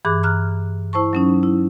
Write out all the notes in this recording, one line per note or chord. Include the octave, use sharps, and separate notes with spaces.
G2 E3 G#4 D6 F#6
A#5 F6 F#6
E4 C5 A5 C#6
F#3 C#4 D#4
E4